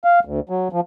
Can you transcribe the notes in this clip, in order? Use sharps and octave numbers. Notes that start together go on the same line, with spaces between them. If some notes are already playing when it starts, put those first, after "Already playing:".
F5
D2
F#3
F3